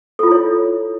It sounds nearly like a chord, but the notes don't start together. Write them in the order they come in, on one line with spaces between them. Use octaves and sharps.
A4 F4 E4 C#5